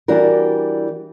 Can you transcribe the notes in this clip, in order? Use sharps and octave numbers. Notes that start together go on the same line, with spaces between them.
E3 G3 D4 F#4 A#4